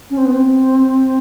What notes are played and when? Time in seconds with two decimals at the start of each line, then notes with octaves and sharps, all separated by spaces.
0.10 C#4
0.17 C4
0.25 B3
0.33 C4